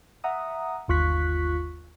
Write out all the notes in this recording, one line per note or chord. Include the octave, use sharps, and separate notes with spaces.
E5 F#5 A#5 D#6
G1 D#2 F4 C#6 F#6 B6